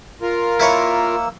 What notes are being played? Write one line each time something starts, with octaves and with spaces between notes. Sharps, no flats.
F4 A#4
A#3 E4 B4 C#5 E6